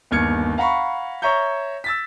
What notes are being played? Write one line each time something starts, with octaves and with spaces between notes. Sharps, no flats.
G1 D#2 F6 G#6 C#7
F5 F#5 A#5 B5 C#6
C#5 E5 A#5 C#6 G6
E6 A6 B6